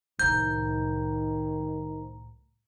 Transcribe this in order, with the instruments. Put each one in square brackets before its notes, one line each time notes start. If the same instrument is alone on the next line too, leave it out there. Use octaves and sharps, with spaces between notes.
[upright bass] C2 A2 [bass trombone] D#3 [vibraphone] C5 A#5 [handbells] G6